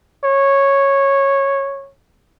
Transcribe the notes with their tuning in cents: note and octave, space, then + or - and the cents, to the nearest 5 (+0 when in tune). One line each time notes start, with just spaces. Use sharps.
C#5 -10